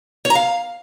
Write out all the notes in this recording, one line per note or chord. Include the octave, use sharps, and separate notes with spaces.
C#5
A#5
F5